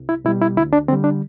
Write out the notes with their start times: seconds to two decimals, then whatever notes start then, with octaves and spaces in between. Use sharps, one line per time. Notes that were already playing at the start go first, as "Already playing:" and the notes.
Already playing: C2
0.09 E4
0.25 B2 G3 E4
0.42 E4
0.57 D2 E4
0.73 D4
0.88 D3 G3 C4
1.04 D4